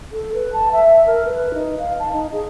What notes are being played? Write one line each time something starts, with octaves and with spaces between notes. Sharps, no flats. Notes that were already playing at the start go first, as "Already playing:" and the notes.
A4
B4
A5
E5
A#4
B4
D#4
F5
A5
D#4
G#4